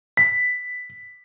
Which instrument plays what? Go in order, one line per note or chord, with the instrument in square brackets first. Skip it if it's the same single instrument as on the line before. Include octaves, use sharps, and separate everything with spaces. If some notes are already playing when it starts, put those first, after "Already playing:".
[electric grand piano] B6